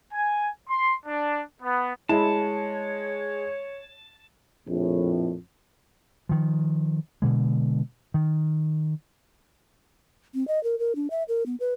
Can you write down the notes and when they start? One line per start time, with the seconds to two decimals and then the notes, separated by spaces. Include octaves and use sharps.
0.13 G#5
0.68 C6
1.06 D4
1.63 B3
2.09 G#3 E4 C#5 A5
4.67 A#1 F2 A2
6.29 D#3 F3
7.22 B2 D3 G#3
8.14 D#3
10.34 C4
10.48 D#5
10.64 A#4
10.79 A#4
10.96 D4
11.11 E5
11.29 A#4
11.46 B3
11.60 B4